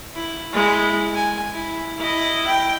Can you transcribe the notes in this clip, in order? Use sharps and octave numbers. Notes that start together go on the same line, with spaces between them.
E4
G#3 E4
G#5
E4
E4 D#5
G5